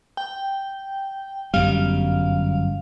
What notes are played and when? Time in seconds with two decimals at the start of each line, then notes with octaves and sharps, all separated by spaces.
0.17 G5
1.54 G1 F#2 G3 F5